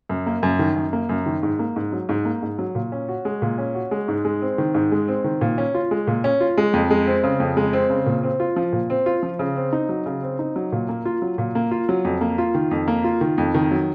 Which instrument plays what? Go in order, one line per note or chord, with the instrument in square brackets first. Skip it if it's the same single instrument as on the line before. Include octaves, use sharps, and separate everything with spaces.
[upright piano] F#2
A#3
F#2
D#3
F#2
A#3
F#2
D#3
G#2
A#3
G#2
F#3
G#2
A#3
G#2
F#3
A#2
C#4
F#4
G#3
A#2
C#4
F#4
G#3
G#2
G#3
C4
D#3
G#2
G#3
C4
D#3
A#2
C#4
F4
G#3
A#2
C#4
F4
G#3
F2
G#3
C4
C#3
F2
G#3
C4
C#3
A#2
C4
F4
F3
A#2
C4
F4
F3
C#3
C4
D#4
F#3
C#3
C4
D#4
F#3
A#2
A#3
F4
F#3
A#2
A#3
F4
F#3
F2
A#3
F4
D#3
F2
A#3
F4
D#3
F2
D#3
F#3